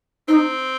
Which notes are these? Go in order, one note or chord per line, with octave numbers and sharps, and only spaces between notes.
C4 D#4